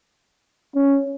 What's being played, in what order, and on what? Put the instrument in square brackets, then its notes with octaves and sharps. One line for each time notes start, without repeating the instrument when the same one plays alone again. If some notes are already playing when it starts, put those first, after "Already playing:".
[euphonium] C#4